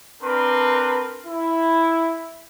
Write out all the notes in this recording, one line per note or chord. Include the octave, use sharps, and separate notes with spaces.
C4 D4 A#4 B4 C6
E4